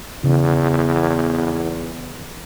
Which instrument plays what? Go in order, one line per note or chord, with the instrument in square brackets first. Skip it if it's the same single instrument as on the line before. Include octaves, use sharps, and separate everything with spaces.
[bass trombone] E2 [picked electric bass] C#3